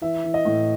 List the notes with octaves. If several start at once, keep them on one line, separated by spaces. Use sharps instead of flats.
E3 E5
E3
D#5
A2